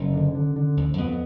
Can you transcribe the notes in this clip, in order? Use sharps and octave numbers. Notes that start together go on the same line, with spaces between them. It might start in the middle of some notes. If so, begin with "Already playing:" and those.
Already playing: F#1 C#4
D3
D3
D3
D2
F2 B3